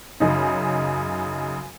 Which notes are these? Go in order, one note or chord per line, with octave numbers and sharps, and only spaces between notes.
F#2 C#3 D#4